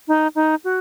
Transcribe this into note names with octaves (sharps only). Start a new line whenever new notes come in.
D#4
D#4
F#4